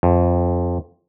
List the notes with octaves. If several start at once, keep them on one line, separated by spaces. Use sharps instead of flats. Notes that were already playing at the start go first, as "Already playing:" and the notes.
F2